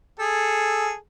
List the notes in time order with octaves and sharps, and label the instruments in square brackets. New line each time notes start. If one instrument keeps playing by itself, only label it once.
[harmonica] G#4 A4